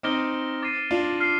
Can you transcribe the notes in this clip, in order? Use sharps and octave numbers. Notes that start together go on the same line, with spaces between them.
C4 D#4 D6 F6 A#6 D7 G7
D6 A6 C7 D#7
D4 F4
F6 C7 G7